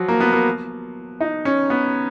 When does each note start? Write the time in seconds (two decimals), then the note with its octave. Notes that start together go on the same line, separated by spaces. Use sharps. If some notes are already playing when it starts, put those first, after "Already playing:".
Already playing: F3 F#3
0.08 A#3
0.20 B3
0.33 A#3
1.21 D#4
1.45 C#4
1.70 B3